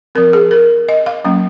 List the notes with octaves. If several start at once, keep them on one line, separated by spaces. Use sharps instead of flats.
F3 C4 A#4
G#4
A#4
D#5
F5
F#3 A#3 C#4